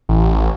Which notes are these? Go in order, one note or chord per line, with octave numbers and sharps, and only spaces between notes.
A1